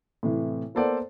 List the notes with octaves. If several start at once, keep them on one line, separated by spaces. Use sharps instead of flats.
A2 C3 E3
A#3 B3 A4 C5 D5 F#5